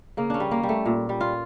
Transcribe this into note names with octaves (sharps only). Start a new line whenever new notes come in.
C#3 A#3
C#4 D4
G3
A#3
G3
A3
A#2
G3
F4